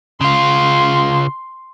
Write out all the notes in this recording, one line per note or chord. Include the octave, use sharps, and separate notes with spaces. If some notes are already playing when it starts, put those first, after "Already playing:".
C#3 F4 C6